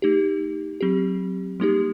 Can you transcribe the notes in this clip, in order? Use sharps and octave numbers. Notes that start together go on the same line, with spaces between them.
A3 D#4 G4
F#3 C4 G4
G3 A#3 D#4 G4